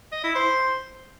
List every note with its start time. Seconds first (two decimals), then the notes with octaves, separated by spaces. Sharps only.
0.12 D#5
0.24 E4
0.35 C5